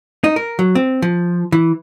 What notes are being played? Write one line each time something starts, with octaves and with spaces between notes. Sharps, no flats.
D#4
A#4
F#3
C4
F3
E3